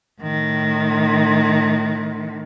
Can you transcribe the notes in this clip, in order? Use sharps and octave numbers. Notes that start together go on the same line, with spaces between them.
A2 D#3